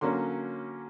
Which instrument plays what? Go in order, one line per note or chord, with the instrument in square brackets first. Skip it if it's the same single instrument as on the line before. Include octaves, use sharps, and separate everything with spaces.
[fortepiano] D3 F#3 A#3 C#4 C6